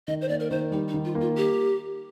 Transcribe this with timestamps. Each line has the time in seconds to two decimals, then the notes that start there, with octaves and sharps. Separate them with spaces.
0.07 D#3 D#5
0.21 C5
0.29 A#3 D5
0.40 A#4
0.50 D#3 C5
0.72 G3 D#4
0.88 D#4
0.94 D#3
1.05 F4
1.15 A#3
1.21 F4
1.37 G4